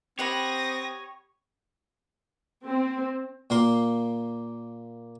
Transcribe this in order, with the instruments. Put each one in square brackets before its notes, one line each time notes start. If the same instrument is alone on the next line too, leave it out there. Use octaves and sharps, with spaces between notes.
[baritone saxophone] C4 [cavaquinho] G4 F#5 B5 [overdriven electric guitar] C#5 [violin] D#6 A#6
[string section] C4
[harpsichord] A#2 A#3 A#4 C6